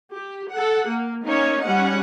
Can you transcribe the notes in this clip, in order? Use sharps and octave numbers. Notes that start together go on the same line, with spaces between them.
G4
A4 F#5
A#3
A#3 C#4 D#4 C#5
G3 C#4 F#5